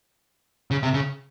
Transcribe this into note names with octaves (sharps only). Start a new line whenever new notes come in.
C#3
C3
C#3